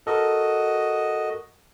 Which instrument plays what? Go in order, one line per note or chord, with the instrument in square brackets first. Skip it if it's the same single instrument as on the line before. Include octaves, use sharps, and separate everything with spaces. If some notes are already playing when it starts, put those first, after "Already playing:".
[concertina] F#4 D#5 [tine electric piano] A4 A#4